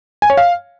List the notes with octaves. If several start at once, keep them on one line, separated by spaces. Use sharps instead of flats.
G#5
C#5
F5